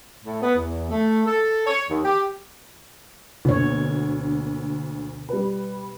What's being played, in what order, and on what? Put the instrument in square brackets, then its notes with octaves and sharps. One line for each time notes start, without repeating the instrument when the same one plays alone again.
[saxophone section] A2
B3
E2
A3
A4
C#5
D#2
G4
[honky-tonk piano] D2 D3 A#3 [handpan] B2 C#5
[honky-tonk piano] G3 B4